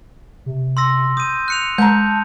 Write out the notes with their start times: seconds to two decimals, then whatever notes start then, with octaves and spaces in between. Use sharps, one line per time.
0.46 C3
0.77 C6 E6 A#6
1.17 D#6 G6 D#7
1.48 F#6 C#7 F7
1.78 G#3 A5 A#5 G6